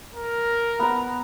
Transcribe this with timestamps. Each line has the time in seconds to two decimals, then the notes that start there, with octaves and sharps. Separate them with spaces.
0.15 A#4
0.79 B3 A#5